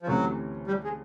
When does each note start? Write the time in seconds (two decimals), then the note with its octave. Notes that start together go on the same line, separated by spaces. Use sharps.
0.03 F3
0.07 D2 C3 E3 F#3 A3 C#4
0.67 G3
0.84 G#3